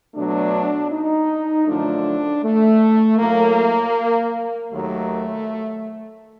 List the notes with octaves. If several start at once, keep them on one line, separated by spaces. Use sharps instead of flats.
B2 F#3 A3 D4
D#4
F#2 D3 F3 A3 D4
A3
A2 F#3 A3 A#3
D#2 D#3 F#3 A3